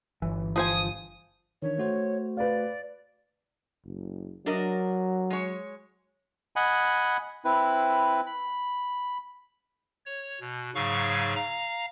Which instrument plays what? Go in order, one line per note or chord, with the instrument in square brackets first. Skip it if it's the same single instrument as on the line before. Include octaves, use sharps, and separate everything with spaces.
[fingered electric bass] G1 [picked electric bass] E3
[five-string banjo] F3 C5 G#5 [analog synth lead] D#6
[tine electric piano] D#3 E3 D4 [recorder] C#5
[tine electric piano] A3 F#4 C5
[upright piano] B4 F5 [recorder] D5
[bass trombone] F#1
[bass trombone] F#3 [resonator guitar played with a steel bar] D4 A#4 D#5
[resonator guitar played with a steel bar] G#3 C#5
[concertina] D#5 F#5 G#5 B5
C4 E4 B4
B5
[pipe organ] C#5
B2
G#2 C#3 F#3 F5 C#6
F5 A#5